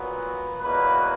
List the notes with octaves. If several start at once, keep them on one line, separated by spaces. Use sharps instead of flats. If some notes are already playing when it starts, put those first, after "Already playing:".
Already playing: A#2 F#3 B3 B4
E2 B2 F#3 A#3 B4